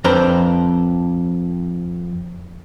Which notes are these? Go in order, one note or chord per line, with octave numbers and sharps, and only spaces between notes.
F2 D4 B4 C5 A#5